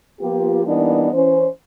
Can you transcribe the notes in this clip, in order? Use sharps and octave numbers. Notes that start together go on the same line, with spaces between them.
F3 A#3 B3 F4 G4
E3 G3 A#3 B3 D4 D#4
E3 C#4 C5